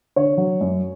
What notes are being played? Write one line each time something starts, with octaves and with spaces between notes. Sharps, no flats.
D3 C#5
F#3
F#2